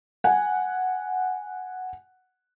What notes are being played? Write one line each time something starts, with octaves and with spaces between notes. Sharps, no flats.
F#5 G#5